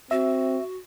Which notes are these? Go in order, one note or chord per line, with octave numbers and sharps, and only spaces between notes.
C4 F#4 E5